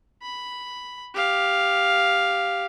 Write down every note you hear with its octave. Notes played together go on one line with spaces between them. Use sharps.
B5
G4 F5